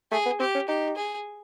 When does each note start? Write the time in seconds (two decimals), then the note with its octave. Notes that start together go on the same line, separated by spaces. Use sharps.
0.12 A3 G#4
0.26 B3
0.40 C4 G4
0.55 C#4
0.68 D#4 G4
0.97 G#4